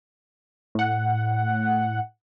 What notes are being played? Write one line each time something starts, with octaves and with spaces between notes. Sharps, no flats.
A2 F#5